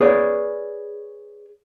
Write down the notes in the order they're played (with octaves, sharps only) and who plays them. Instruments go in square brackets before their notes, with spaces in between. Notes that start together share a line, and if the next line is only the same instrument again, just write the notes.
[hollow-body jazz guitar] G#4 B4 C#5 D5